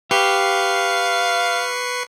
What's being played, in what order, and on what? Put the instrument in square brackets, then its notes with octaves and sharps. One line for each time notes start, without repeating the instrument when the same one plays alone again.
[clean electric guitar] G4 [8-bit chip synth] B4 C#6 C7 [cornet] F5